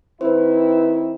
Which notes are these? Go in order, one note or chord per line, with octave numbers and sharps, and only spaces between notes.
D#3 C4 E4 B4 C5